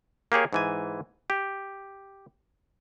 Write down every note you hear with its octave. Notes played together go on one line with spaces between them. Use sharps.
A#3 G4 G#4 C#5
G#2 E3 G#5
G4